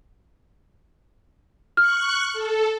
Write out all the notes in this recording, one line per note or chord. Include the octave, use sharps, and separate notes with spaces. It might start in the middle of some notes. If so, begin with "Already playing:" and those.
C#6 F6 F#6
A4